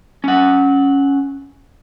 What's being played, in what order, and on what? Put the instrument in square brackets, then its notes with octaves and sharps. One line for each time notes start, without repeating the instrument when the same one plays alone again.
[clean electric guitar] C#4 F#5